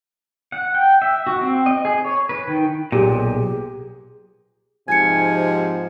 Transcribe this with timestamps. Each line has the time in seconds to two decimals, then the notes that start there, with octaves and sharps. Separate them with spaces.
0.52 F#5
0.75 G5
1.02 E5
1.27 F#4
1.41 C4
1.66 D#5
1.85 G#4
2.05 C#5
2.29 B4
2.47 D#3
2.92 B1 A#2 G4 G#4
4.88 G#2 C3 F3 G#5 G#6 C#7